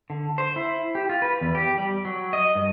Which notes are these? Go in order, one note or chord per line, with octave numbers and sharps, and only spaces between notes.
D3
C5
E4
G4
F4
B4
E2
G4
G3
F#3
D#5
G2